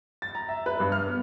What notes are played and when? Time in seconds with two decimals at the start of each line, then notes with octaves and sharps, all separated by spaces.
0.22 A6
0.35 A#5
0.49 E5
0.66 B4
0.80 G2
0.92 F6
1.07 B3